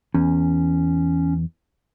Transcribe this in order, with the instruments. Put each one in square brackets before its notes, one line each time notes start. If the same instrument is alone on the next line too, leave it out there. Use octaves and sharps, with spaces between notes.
[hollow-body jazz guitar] E2 [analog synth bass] C#4